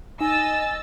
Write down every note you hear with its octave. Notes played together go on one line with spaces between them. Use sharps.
D#4 D#5 G#5 E6 A6